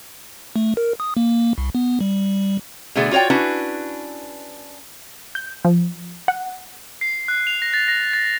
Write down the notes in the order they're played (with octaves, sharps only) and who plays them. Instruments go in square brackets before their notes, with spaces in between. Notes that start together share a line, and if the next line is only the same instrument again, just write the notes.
[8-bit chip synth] A3
A#4
D#6
A#3
C2
B3
G3
[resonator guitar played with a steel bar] B2 D3 A3 G#4 D5
F4 F#4 C#5 D5 G5
C#4 D4 E4 F#4 B4
[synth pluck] G6
F3
F#5
[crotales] C7
F#6
F7
A#6
A6
A#6
A6